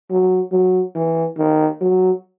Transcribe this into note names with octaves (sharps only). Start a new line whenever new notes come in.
F#3
F#3
E3
D#3
F#3